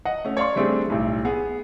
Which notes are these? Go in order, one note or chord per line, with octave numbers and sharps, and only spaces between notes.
D#5 F#5
A3 C#4
C#5 D5 F5 C6 C#6
G3 A3 C4 D4 G#4
B1 A2 G3
B3 G#4